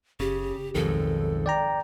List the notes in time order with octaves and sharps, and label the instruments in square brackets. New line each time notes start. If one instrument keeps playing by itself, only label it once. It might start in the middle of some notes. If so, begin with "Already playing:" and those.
[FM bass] F#1 [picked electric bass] C#3 [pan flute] G4
[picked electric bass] B1 F2 G#2 [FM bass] D#3 [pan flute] A4
[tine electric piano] D5 G5 A#5